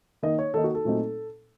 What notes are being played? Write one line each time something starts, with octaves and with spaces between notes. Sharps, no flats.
D#3 A#3 D#4 D#5
C#5
D#3 A#3 D#4 A4
F#4
A4
A#2 F#3 A3 C4 D#4